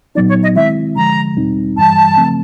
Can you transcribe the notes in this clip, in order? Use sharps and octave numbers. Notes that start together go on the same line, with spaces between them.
A#2 F#3 B3 D#4 D5
C#5
D#5
D#3 G#3 C4 E4 E5
D3 F3 G#3 A#5
E2 B2 G3 C4 D#4
G2 E3 G3 A5
C#3 F3 A3 C4